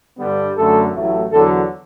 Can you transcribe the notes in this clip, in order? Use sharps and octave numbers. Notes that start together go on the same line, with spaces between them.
G2 D3 G3 B3
F#2 D3 A3 A4
A1 A2 F#3 A3
E2 D3 F#3 A4